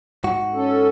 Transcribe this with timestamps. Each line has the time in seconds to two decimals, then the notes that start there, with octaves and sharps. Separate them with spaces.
0.24 G#2 F#4
0.54 C#4 A4